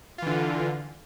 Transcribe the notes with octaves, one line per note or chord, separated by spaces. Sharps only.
D3 E3 F4